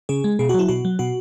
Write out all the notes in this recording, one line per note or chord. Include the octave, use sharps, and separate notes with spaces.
C#3 G#4
G#3
B2 G#4
F#4
F#3 E4
B2 F#4
F#3
B2 F#4